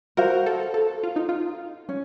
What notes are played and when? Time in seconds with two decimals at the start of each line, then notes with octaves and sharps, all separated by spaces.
0.17 F#4 A#4 C5 F5
0.46 A4
0.74 A4
1.03 F4
1.16 D#4
1.29 F4
1.89 C#4